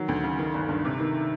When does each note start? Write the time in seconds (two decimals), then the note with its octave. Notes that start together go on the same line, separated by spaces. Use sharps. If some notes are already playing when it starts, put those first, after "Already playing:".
Already playing: D#3 F#3
0.08 D2
0.23 C#3
0.39 D#3
0.54 G1
0.68 G2
0.85 C3
1.00 D#3